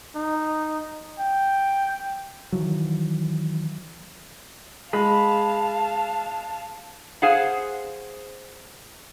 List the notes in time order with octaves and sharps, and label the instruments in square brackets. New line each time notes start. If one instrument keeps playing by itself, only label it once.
[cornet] D#4
G5
[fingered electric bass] D#3 E3 F#3
[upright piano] G#3 [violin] F5 A5 [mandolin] B5
[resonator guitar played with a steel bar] G#4 C5 F5 F#5